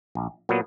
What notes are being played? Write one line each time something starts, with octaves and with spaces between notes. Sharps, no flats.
A#1
A#2 F#3 B3